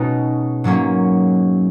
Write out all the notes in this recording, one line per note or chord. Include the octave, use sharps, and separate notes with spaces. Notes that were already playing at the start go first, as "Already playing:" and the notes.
Already playing: B2 G#3 C#4 D#4
G#2 F#3 A#3 C#4